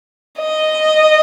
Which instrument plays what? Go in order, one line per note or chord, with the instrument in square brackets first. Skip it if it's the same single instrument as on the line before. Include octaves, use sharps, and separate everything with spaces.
[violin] D#5